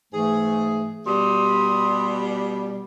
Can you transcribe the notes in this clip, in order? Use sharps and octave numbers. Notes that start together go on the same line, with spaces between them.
G#2 E3 A3 G#4
B2 G3 C6 D#6